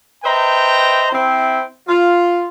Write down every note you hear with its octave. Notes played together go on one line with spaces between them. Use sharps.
B4 C5 D#5 E5 G5 A#5
C4 E4
F4